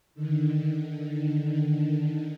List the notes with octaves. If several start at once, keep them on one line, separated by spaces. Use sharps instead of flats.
D3 D#3